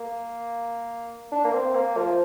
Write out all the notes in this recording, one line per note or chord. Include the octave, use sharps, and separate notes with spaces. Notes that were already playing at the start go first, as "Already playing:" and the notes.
Already playing: A#3
D4
A#3
C4
A#3
F3